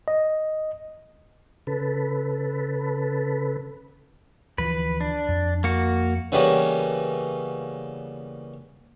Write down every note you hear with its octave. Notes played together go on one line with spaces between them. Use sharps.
D#5
C#3 A4 B4
D2 E3 F3 B4
D4
F2
A#3 F#4
C#3 E3 G3 A#3 B3 C#4